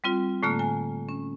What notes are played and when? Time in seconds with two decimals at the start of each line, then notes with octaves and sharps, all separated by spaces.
0.04 G3 C4 F4
0.43 A2 D3 A3 A#3 F6
0.59 G#5
1.09 C#4